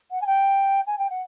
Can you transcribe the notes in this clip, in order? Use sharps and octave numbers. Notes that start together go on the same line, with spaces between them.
F#5
G#5
G5
G#5
G5
F#5